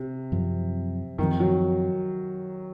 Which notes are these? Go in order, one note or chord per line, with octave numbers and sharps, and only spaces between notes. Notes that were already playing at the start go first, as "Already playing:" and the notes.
Already playing: C3
F#2 F3 C4
F#2 D#3 F3 C4
F#3